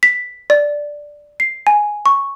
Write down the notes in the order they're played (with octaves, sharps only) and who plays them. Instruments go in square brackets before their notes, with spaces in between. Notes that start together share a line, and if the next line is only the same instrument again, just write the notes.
[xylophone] B6
D5
C7
G#5
C#6